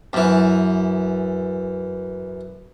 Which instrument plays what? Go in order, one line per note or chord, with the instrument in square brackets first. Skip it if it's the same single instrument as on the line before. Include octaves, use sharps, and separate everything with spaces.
[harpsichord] F#2 E3